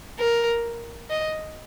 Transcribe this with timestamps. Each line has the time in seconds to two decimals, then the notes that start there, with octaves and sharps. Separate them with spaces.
0.19 A#4
1.10 D#5